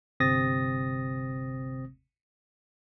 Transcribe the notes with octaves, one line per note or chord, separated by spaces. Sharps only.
G1 C3 C4 D#6 A6 A#6